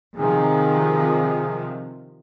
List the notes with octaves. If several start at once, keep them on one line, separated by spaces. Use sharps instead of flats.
C3 D#3 F3 G#4